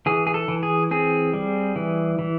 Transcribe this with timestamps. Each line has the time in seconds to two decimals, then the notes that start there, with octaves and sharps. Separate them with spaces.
0.06 E3 G#4
0.27 G#4
0.34 A4
0.48 E3
0.63 G#4
0.91 C4 G#4
1.34 G3
1.76 E3
2.19 E3